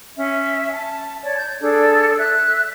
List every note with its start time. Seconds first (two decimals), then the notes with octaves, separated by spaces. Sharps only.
0.17 C#4 E5
0.73 A5
1.22 C#5 D5 A5
1.37 G6
1.62 D4 G#4 A4 D5
2.19 E5 F#6